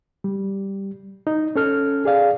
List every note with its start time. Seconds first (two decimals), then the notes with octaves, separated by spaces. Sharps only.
0.24 G3
1.27 D#4
1.56 C#4 A4 F6
2.05 G#4 D5 F5